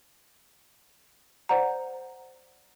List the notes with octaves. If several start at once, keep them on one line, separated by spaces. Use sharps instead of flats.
C5 D5 F#5 A#5